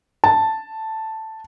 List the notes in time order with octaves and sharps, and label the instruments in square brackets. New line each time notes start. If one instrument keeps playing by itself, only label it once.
[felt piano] A5